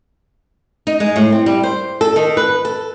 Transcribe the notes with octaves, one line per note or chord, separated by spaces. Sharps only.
D#4
G#3
A2
C4
G3
C5
A4
D#3
B4
A4